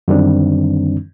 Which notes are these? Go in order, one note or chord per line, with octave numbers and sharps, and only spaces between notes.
F#2 D3 D#3 G3 C4 D4